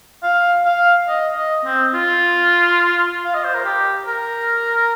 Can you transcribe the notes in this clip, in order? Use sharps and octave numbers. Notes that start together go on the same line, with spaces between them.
F5
F5
D#5
D#5
C4
F4
F5
D#5
C5
A#4
G4
A#4